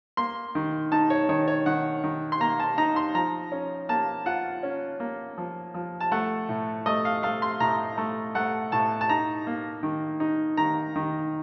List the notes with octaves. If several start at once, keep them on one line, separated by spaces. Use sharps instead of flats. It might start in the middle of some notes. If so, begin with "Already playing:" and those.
A#3 C6
D#3
D#4 A5
C#5
D#3 C#5
C#5
D#3 F#5
D#3
C6
A#3 A#5
A5
D#4 A#5
C6
F3 A#5
C#4
A#3 A5
F4 F#5
C#4
A#3
F3
F3
A5
A3 F#5
A2
A3 D#5
F5
A3 F5
C6
A2 A#5
A3
A3 F#5
A2 A5
A5
D#4 A#5
A#3
D#3
D#4
D#3 A#5
D#3